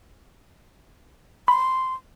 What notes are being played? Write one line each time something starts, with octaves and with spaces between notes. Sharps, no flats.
B5 C6